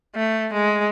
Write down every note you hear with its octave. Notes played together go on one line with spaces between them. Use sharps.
A3
G#3